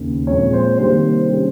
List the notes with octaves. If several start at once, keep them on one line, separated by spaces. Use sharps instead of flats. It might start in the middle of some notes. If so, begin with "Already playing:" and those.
Already playing: D#2 C#3
A#2 F3 G#3 C4 C#5
C5
C3 D#3 G3 A#3 C5
G3 C#4